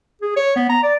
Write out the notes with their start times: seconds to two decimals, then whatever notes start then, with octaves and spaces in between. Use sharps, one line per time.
0.22 G#4
0.37 C#5
0.56 B3
0.69 A#5
0.83 D5